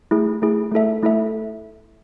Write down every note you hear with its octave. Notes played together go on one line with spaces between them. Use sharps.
A3 E4 G#4
A3 E4 G#4
A3 E4 A4 E5
A3 E4 A4 E5